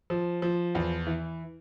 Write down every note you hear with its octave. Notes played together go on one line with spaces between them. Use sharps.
F3
F3
E2
E3